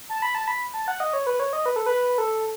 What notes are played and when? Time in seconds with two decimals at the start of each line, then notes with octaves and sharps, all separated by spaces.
0.09 A5
0.22 B5
0.35 A5
0.48 B5
0.74 A5
0.88 F#5
1.00 D#5
1.13 C#5
1.27 B4
1.40 C#5
1.53 D#5
1.66 B4
1.76 A4
1.86 B4
2.18 A4